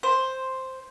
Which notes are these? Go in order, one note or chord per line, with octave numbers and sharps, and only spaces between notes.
C5